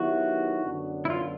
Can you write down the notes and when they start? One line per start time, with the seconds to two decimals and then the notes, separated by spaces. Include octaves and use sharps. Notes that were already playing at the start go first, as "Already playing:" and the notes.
Already playing: D#3 F#3 B3 E4 F#4 G4
0.64 F#2 D3 F#3 B3 D4
1.05 E4
1.10 F4